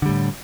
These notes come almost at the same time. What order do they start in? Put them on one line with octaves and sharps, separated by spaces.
D3 G3 A2